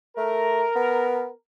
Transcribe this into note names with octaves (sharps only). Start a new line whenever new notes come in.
A3 A#4
B3